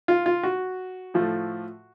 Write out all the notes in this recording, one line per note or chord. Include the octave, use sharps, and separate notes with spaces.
F4
F4
F#4
A2 F3 A3